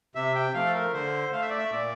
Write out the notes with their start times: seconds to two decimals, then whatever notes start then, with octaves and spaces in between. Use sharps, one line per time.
0.15 C3 E5
0.35 G5
0.54 F3 A3 F5
0.66 A4
0.74 A#4
0.94 D3 C5
1.33 A3 F5
1.41 E5
1.49 D5
1.58 E5
1.72 A#2 D5